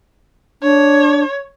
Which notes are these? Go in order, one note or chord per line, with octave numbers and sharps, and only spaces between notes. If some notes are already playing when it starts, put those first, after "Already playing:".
D4 C#5